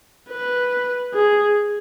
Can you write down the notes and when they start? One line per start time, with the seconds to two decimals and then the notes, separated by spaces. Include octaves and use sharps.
0.30 B4
1.14 G#4